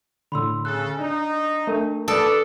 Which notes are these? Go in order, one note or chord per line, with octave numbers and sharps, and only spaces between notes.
A2 D3 B5 C6 E6
C#3 A4 F#6
D4 D#4
A3 D4 A#4
D4 A4 B4 D5 D#6 D7